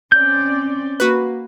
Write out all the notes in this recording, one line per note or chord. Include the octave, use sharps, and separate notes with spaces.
C4 C#4 D5 G6
A#3 F#4 B4